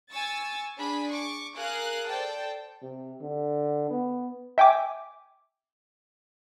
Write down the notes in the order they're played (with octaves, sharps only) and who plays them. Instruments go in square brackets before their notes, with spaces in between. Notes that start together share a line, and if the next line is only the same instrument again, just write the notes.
[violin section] G#5 C#6 E6 A6
D4 G#4 B5
C#6 D6
G#4 A#4 F5 F#6
A4 C5 D5 G5 A5
[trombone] C3
D3
B3
[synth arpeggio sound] E5 G5 G#5 D6